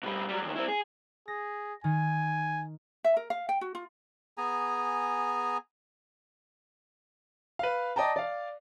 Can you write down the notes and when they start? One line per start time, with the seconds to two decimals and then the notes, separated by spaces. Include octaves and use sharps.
0.03 B2 G3
0.29 F#3 G3
0.42 E2 D#3
0.56 C4 E4
0.68 G#4
1.28 G#4 A#6
1.84 D#3 G#5
3.04 E5
3.17 A#4
3.30 F5
3.49 G5
3.61 F#4
3.75 F4
4.38 B3 G#4 G#5 A#5
7.59 B4 F5
7.96 D5 D#5 G5 A5 A#5
8.16 D5 F5